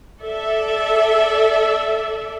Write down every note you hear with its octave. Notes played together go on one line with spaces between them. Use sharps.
A4 D5 E5